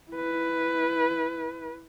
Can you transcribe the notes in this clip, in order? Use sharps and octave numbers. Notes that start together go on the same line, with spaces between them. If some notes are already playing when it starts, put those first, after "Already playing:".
E4 B4